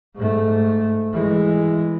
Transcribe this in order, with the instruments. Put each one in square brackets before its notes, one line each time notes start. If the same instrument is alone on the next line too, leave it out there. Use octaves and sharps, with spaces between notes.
[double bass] G#2 A3
E3 G#3